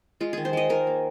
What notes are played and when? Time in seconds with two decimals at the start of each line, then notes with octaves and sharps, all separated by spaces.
0.20 G#3 F4
0.33 D#3 G#4
0.45 C5
0.53 G#3 D#5
0.69 D#3 A#4
0.87 A#3